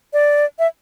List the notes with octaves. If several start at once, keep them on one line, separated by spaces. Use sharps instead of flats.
D5
E5